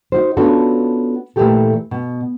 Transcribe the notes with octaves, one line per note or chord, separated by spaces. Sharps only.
D#4 F#4 C5
B3 C#4 D4 F4 F#4 A4
A#2 E3 G#3 A3 G4 A4
B2